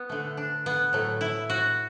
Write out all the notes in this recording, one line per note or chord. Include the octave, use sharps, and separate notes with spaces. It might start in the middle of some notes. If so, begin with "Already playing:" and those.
Already playing: B3
D3 A3
D4
B3
A2 F#3 A3
E4
F#4